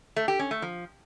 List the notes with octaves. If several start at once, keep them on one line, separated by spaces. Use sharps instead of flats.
A3
G4
C#4
A3
F3